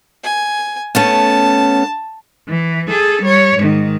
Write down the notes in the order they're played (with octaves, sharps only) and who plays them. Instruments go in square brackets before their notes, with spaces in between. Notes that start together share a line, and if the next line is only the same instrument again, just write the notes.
[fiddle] G#5
[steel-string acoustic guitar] A3 B3 C#4 [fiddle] A5
[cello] E3
G#4 A4
G3 C#5
G#2 D#3